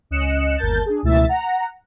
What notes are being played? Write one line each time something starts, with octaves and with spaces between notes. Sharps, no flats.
C#2 C#4 D#5 F#6 C#7 E7
G1 D#2 A#4 A5 G6 A6
D4 G#4
C#2 B2 E3 A3 E5 A6
F#5 A#5